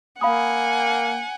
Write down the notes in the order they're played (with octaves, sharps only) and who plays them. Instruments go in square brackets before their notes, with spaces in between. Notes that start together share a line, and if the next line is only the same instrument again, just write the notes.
[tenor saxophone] A#3 [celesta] F5 B5 D#6 [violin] F#5 G#5